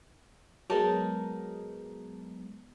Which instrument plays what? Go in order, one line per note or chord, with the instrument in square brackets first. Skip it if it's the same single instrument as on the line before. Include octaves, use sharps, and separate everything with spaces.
[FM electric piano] F#3 G#3 B3 [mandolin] D#4 A#4 A5